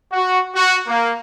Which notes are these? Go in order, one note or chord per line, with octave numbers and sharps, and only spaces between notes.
F#4
F#4
A#3